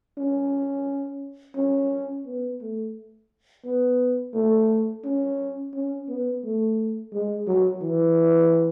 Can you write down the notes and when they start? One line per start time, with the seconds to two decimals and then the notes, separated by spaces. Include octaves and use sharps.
0.18 C#4
1.56 C#4
2.26 B3
2.61 A3
3.65 B3
4.34 A3
5.05 C#4
5.74 C#4
6.09 B3
6.44 A3
7.13 G#3
7.47 F#3
7.82 E3